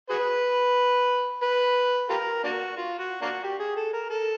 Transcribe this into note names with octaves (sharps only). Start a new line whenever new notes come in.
F#4 G#4 B4
B4
F4 G4 A#4
A#3 D4 F#4
F4
F#4
A#3 D4 F#4
G4
G#4
A4
A#4
A4